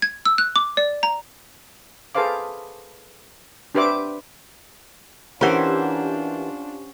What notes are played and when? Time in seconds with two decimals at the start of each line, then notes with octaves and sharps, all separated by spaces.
0.02 G#6
0.26 E6
0.38 F#6
0.56 D6
0.77 D5
1.03 A#5
2.15 G#4 A4 B4 C5 F5 D6
3.75 D4 G4 B4 C5 E5 D6
5.41 E3 C#4 D4 F4 G4 A#4 C5 F#5